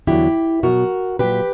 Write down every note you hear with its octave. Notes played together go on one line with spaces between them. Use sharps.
E2 D3 F#3 E4 G4
B2 F#3 F#4 A#4
A#2 F#3 G4 B4